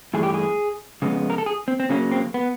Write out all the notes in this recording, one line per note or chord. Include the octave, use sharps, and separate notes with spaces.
G2 E3 A3 G#4
G4
G#4
F2 C#3 G#3 B3
A#4
A4
G#4
C4
C4
C#3 F#3 A#3 C#4
C4
B3